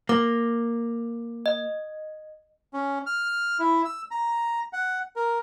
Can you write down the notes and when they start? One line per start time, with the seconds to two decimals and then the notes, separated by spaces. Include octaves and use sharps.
0.09 A#3 D6
1.46 D#5
2.74 C#4
3.06 F6
3.59 E4
3.85 E6
4.11 A#5
4.73 F#5
5.16 A#4